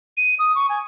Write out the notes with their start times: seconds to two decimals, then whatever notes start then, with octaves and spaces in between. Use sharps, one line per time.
0.17 D#7
0.39 D#6
0.55 C#6
0.69 G#5